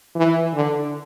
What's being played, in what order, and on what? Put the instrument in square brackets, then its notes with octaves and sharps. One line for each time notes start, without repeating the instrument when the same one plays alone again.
[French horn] E3
D3